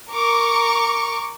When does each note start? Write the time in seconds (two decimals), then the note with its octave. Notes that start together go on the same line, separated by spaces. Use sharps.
0.11 A#4 C#6 D6